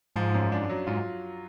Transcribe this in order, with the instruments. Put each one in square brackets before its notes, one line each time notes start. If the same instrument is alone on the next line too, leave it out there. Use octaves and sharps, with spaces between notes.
[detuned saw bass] G#2 [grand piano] F3
[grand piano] F#2
D4
F#3
[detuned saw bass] G#2 [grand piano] F4